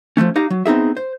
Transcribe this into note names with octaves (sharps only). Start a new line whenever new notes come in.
F3 G#3 A3 C#4
D#4 G4 F5 A#5
F#3
B3 C4 D#4 G#4 E5
C5